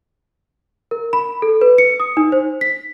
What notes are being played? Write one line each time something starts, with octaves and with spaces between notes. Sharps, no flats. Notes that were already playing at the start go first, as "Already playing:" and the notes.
A#4
B5
A4
B4
C#7
D#6
D#4
C5
B6